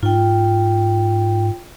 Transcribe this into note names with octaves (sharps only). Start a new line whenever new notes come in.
G#2 F4 G5